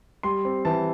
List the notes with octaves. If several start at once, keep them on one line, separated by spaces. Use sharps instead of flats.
G3 C6
C4
E3 A5